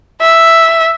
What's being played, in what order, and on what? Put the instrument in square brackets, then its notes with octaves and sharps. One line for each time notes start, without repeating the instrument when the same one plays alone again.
[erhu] E5